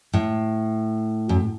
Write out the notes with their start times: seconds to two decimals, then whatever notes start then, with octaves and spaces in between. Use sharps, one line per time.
0.14 A2
1.29 F#2